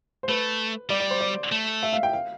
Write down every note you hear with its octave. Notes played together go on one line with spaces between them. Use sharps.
C5
A3 B4
G3 D5
D5
C5
D5
A3
E5
F5
G5
F5